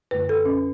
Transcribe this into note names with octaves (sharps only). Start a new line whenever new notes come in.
F#2 D3 A3 B4
A4
C#4